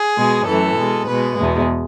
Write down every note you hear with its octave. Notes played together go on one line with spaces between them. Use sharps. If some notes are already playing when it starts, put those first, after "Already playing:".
Already playing: G#4
B2 G#3
F#2 E3 A3 A4
B2 G#3
B2 G#3 B4
E2 B2 G#3